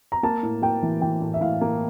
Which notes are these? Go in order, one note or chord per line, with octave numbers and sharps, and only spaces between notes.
A#5
A#3 A5
A2
A#3 G5
E3
E3 G5
A2
E5
A2 F5
A#3